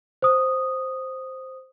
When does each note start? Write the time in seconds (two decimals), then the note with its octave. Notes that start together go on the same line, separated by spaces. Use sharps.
0.22 C5 D#6